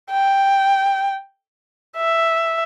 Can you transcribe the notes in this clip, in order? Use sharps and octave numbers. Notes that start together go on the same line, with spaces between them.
G5
E5